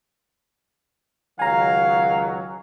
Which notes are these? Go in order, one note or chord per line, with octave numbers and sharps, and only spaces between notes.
C#2 D#3 F#3 F5 G#5 A#5